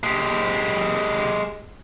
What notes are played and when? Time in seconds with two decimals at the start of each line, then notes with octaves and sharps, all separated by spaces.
0.03 G#3 G4